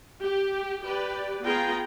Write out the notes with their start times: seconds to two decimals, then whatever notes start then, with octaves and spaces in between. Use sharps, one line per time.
0.22 G4
0.83 G4 B4 D5
1.43 B3 F4 G#4 G5 A#5